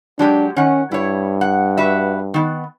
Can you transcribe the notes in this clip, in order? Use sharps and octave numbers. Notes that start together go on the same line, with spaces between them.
F#3 G#3 D4 G4
D#3 C#4 F#5
G2 E4 C#5
F#5
F#4 B4 E5
D#3 B3